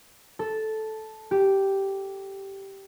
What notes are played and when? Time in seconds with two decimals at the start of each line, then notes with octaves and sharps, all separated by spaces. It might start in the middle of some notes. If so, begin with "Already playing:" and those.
0.39 A4
1.31 G4